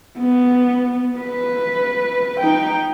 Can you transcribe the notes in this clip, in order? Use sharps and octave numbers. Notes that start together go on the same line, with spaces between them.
B3
B4
D#4 G5